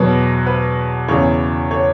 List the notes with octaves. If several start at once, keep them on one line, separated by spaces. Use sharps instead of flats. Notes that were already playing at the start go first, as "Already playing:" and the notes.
Already playing: E2 B2 F#3 B4
B4
E2 C#3 E3 C#5
C#5